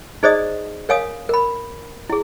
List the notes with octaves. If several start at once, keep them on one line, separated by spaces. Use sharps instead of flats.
D#4 G#4 C5 D5 D#5 D#6
A#4 C#5 F5 G#5 D#6
A#4 B5
E4 G#4